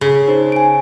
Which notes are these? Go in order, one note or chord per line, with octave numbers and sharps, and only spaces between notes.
C#3
D#4 C5
G#5 D7